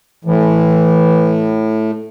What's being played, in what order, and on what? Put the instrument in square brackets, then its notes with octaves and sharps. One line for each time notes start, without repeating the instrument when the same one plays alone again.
[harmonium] A2 [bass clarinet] E3